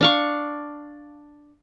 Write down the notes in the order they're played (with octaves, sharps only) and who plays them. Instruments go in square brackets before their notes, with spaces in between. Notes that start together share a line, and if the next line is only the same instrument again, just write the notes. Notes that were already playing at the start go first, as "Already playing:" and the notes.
[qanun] D4 F5 C#6